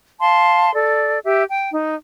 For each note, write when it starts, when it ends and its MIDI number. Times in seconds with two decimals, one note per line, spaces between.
0.21 0.73 77
0.21 0.73 81
0.21 0.73 84
0.75 1.19 69
0.75 1.19 74
1.24 1.43 67
1.24 1.43 76
1.50 1.71 79
1.72 1.95 63